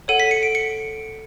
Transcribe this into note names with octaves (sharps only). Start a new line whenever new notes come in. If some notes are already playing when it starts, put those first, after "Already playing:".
A4 C#5 F#5 D#7
B6
C#7
D7
C#7